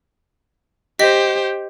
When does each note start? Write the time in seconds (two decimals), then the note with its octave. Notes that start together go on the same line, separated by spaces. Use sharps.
0.99 G4 C5 D#5 B6